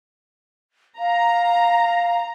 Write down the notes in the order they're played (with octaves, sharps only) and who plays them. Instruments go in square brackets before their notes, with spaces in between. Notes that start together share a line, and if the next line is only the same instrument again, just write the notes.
[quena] F5 [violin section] A#5